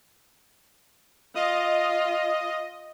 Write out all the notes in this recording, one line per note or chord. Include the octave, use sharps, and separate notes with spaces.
F4 D#5